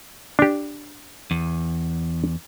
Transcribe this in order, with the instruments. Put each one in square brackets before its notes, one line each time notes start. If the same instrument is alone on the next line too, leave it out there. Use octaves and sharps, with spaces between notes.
[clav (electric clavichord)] D4 G4
[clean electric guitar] E2